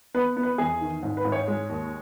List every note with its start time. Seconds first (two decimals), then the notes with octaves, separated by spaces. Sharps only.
0.14 B3 B4
0.37 B3
0.43 B4
0.58 E2 G#4
0.81 D#3
1.03 G#2
1.17 B4
1.25 G#2
1.32 C#5
1.48 G#3
1.69 D#2